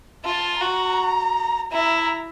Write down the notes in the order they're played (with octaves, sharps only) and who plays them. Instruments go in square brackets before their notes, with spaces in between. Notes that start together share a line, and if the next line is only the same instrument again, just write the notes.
[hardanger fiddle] F4 [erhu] A5
[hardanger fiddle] F#4 [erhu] A#5
[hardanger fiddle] E4 [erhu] A#5